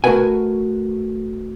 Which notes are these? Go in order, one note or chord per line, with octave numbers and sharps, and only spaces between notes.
A3 F#4 A#4 B4 F#5 G#5